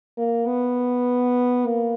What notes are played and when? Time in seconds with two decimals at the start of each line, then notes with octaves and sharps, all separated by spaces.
0.18 A#3
0.47 B3
1.66 A#3